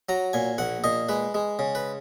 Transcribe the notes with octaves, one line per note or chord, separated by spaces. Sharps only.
F#3 A#5
A#2 G#5
A#1 F#5
A#2 D#5
G#3 B4
G#3
C#3
B4